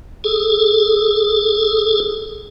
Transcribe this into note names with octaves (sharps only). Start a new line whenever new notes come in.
G#4 A4